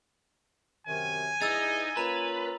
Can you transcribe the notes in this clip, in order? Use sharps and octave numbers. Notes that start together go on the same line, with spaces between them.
F#2 C3 D#3 G#5
G2 E3 D#4 G#4 E6 A6
A#3 C#4 F4 B4 A#5 F7